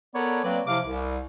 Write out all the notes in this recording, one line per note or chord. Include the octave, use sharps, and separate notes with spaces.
B3 A4 A#4 C#5 D5
F#3 A#3 C4 B4 D5
C3 F3 E4 F5 D6
C2